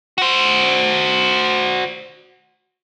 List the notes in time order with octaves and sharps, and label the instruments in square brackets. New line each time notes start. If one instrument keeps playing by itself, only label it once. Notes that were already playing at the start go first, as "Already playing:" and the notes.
[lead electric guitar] F#4 C5